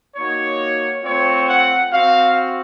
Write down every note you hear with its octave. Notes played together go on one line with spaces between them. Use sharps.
A#3 D#4 F#4 C#5
A3 C4 F4 C#5
F#5
C4 F#4 F5